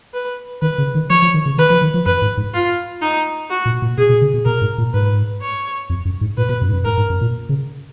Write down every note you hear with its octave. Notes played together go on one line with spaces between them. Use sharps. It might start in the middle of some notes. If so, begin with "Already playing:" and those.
B4
D#3 B4
C#3
D#3
F3 C#5
F3
D#3
C#3
D#3 B4
F3
D#3
F3
F#2 B4
G#2
G#2
F4
D#4
F#4
A#2
A#2
B2 G#4
B2
C#3
B2
B2 A#4
G#2
A#2
G#2 B4
C#5
F2
F#2
G#2
A#2 B4
B2
F#2
G#2
F#2
G#2 A#4
G#2
F#2
A#2
C#3